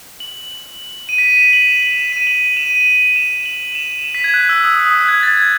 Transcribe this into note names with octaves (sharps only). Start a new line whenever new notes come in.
F#7
D#7
B6
D#7
E7
F#7
E7
F#7
E7
D#7
F#7
E7
D#7
D#7
E7
F#7
E7
E7
B6
G#6
F#6
E6
D#6
D#6
F#6
G#6
A6
G#6